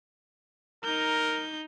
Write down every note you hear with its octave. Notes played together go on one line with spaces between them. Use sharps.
D#4 A#4 G6